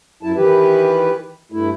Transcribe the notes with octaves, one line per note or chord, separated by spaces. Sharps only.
F#2 F#3 E4 A5
D#3 E3 G4 B4
G2 A3 E4